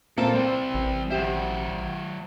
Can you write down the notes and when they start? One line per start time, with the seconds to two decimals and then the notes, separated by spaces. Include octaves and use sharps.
0.18 A#2 A#3 C4 A4 A5
0.33 G3 C4 C5
0.74 A1
1.11 F#3 G4 C5 E5